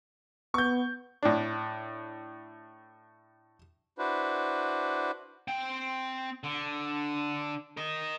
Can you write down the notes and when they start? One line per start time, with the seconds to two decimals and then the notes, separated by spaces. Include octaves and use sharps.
0.54 B3 C#6 G6
1.23 A2 D4
3.99 D4 E4 F#4 B4 C5
5.48 C4 G5
6.44 D3
7.77 A#4 D#5